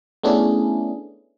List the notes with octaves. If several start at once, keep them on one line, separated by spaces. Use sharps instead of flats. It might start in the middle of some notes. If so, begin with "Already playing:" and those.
A3 B3 C#4 D4 E4 G#4